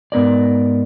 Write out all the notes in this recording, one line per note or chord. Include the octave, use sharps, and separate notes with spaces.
G#2 B3 A#4 D5